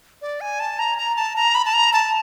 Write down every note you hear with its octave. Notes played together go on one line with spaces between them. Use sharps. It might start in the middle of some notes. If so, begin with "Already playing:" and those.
D5
G#5
A5
A#5
A#5
A5
A#5
B5
A5
A#5
A5